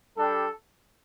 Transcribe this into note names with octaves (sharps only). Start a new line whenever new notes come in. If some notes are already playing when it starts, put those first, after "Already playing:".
G3 D4 G4 A4